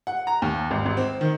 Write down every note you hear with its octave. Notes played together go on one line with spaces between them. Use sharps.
F#5
A#5
D#2
G#1
G#1
C4
D#3